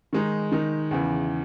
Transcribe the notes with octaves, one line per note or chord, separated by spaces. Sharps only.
D#3 G#3 D#4
D#3 G#3 D#4
E2 C#3 E3